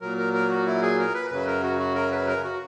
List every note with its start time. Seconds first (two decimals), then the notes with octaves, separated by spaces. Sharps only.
0.01 A#2 F#3 A#4
0.18 A#4
0.33 A#4
0.50 F#4
0.66 E4
0.82 G#4
0.98 A#4
1.14 B4
1.30 F#2 C#3 F#3 B4
1.47 A#4
1.63 F#4
1.79 F#4
1.95 A#4
2.11 B4
2.27 A#4
2.43 F#4